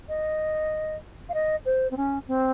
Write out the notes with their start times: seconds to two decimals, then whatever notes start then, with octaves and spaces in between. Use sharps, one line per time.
0.09 D#5
1.29 F5
1.34 D#5
1.65 C5
1.91 C4
1.97 C#4
2.28 C4